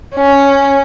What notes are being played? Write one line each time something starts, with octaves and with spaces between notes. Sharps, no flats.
C#4